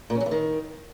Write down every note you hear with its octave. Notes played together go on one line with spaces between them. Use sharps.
A#2
C#4
F#3
E3
D#3